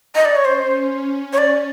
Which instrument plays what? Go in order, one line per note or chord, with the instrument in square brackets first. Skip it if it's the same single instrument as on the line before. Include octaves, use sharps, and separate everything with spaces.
[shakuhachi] D#5
D5
C#5
[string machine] C#4 [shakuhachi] C5
[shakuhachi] C#5
D5